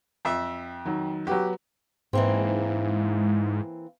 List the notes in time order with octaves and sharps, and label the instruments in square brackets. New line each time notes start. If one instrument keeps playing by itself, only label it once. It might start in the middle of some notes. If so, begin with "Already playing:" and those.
[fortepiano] F2 E5
[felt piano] D#3 F#3
[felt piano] F#3 B3 F#4 [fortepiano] G4
[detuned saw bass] G#2 [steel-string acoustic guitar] E3 A#3 C4